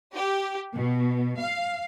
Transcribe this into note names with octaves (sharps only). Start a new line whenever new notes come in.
G4
B2
F5